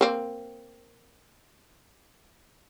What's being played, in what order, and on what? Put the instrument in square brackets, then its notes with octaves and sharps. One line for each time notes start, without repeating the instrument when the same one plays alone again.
[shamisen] A#3 C4